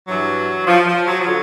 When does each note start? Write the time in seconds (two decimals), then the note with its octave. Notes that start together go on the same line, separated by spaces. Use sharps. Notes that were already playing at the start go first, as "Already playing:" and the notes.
0.08 G2 E3 F#3
0.67 F3
0.87 F3
1.07 F#3
1.21 F3
1.27 D3 F#3